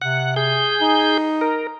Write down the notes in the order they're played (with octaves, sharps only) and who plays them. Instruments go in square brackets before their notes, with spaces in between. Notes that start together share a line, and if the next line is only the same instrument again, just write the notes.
[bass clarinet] C3 [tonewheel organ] F#5
[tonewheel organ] G#4 G6
[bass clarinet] D#4
[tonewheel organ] A#4